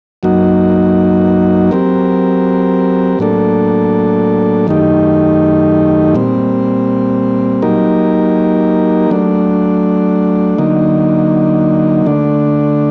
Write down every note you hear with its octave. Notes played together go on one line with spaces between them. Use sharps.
F#2 F#3 A#3 D#4 F#4
F#3 C4 G4 A#4
A2 F#3 A#3 D4 A4
F#2 D#3 A3 D#4 G4
A#2 G3 C4
F#3 A#3 D#4 G4 A#4
F#3 A3 D4
D3 F#3 A#3 D#4
D3 A3 D4